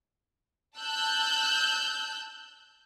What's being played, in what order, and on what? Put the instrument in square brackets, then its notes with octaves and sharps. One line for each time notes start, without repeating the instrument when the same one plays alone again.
[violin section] A5 E6 F#6 G6